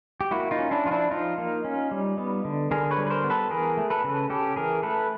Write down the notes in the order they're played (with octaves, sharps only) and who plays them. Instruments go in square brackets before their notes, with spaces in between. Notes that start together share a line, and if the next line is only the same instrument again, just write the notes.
[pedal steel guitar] G4
A#3 E4 F#4
D#4 F4
C#4
D4 E4
F3 F4
D4 E4
F3 D#4 F4
A#3
C#4
G3
B3
D3
D3 G#4 A#4
B4 C#5
G3
B4
A#4 C5
B3
A4 B4
E3 G#4 A#4
A3
A4 B4
C#3
C#4 G4 A4
E3 G#4 A#4
A3 A4 B4